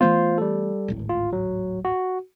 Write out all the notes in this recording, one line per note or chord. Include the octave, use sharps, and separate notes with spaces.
E3 A3 B3 F4 C5
G3 A4
D1 G#1 A2
F4
F#3
F#4